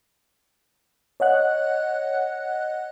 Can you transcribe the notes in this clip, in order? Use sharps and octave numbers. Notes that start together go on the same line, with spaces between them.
C#5 D#5 F#5 F#6